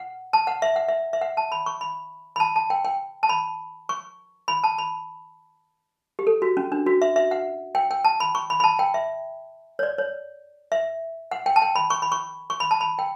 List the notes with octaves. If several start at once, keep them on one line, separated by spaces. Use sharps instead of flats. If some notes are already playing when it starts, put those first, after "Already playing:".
Already playing: F#5
A5
F#5
E5
F#5
E5
E5
F#5
A5
B5
C#6
B5
B5
A5
A5
G5
G5
A5
B5
C#6
B5
A5
B5
G4
A4
F#4
C#4
D4
F#4
E5
E5
F#5
G5
G5
A5
B5
C#6
B5
B5
A5
G5
E5
C#5
D5
C#5
E5
F#5
G5
A5
G5
B5
C#6
B5
C#6
C#6
B5
A5
B5
G5